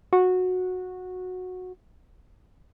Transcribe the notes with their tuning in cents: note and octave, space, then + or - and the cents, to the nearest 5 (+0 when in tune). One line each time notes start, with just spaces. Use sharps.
F#4 -15